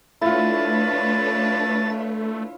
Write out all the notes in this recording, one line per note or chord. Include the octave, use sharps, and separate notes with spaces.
A3 D4 E4 F4 B4 C#5 A6